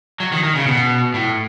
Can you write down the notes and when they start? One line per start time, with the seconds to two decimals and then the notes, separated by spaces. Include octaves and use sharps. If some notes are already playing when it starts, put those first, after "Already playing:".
0.20 F#3
0.32 D#3
0.43 D#3
0.55 C#3
0.67 B2
1.14 A2